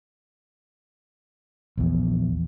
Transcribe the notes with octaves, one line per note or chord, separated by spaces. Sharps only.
A#1 E2